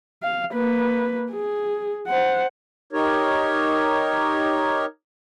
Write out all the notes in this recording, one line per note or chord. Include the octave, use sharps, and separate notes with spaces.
F5
A#3 B4
G#4
C5 F#5
D#4 G4 A#4 C#5